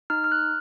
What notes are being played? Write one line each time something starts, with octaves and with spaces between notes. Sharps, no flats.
D#4 F6
F6
F#6